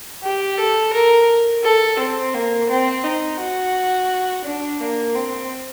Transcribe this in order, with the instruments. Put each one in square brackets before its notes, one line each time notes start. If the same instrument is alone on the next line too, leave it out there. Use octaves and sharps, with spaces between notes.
[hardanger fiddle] G4
A4
A#4
A4
C4
A#3
C4
D#4
F#4
D4
A#3
C4